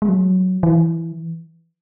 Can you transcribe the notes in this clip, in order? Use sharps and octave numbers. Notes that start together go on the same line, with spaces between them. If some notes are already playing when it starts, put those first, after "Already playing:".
G#3
F#3
E3